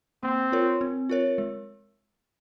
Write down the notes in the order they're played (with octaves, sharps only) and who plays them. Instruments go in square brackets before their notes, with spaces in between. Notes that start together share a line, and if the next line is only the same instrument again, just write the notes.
[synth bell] A#3 [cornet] C4
[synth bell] F4 A#4 C#5
C4
F4 A#4 C#5
G#3